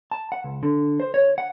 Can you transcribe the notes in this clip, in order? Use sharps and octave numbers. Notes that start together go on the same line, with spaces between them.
A5
F#5
C#2
D3
C5
C#5
F#5